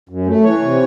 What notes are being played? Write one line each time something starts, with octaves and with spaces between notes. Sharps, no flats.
F#2
A3
E3 C#5
C3